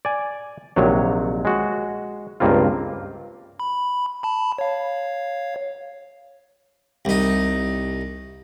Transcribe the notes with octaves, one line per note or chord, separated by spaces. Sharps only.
D5 G#5
A#1 C3 D#3 F#3 C#5
G#3 F#4
C#2 G2 A#3 C4 F4
B5
A5 B5
C#5 F5
C2 D#4